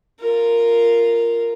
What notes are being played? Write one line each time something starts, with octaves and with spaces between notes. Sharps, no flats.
F4 A#4